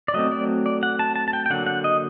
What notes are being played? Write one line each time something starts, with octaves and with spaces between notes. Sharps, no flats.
D5
F#3 A3 C4 D#5
D5
D5
F#5
A5
A5
A5
G5
G5
D3 F#3 A#3 F#5
F#5
D#5